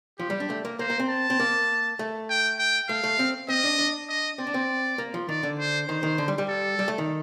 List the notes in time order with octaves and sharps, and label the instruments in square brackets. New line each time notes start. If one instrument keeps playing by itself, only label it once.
[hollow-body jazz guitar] F3 [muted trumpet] G4
[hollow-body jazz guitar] G3
D4
A3
A#3
[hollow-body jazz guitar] A#3 [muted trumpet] C5
[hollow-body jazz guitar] A#3
C4
[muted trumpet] A5
[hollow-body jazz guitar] C4
A#3
A3
[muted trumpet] G5
G5
[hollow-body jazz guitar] A3 [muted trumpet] F5
[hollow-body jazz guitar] A3
C4
[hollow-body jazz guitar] C4 [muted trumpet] D#5
[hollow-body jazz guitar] D4
D4
[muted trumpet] D#5
[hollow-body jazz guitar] C4 [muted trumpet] D5
[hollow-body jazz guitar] D4
C4
A#3
F3
[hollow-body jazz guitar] D#3 [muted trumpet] D5
[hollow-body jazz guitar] D3
[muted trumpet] C5
[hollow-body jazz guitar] D#3 [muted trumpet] C5
[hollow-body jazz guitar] D#3
D3
G3
G3
[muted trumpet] A4
[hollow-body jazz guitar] G3
A3
D#3